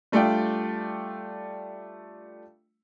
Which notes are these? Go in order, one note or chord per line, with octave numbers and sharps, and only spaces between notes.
G3 A3 D4 F4 D5 G5